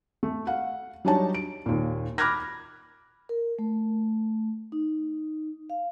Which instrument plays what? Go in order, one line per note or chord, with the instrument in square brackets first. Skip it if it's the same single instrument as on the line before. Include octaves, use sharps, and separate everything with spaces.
[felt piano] A3
F5 F#5
F#3 G3 D4 D#4 C#5 A5
D7
D#2 A#2
B5 D6 F6 F#6 G#6 A#6
[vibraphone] A#4
A3
D#4
F5